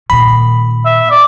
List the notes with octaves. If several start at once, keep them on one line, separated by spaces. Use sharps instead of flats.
A#2 D#3 B5
E5
D5